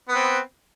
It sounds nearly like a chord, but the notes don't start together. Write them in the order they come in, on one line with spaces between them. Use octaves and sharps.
B3 B4 C4